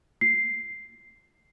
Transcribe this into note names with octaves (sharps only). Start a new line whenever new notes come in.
C7